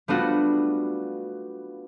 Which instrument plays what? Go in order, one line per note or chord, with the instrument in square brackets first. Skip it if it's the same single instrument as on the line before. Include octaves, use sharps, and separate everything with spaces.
[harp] G3 A3 B3 D4 F4 F#4